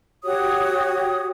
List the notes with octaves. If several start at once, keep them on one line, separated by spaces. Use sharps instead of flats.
F#4 G4 C#5 D#6